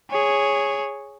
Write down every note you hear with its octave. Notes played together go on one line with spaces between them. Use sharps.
G#4 C#5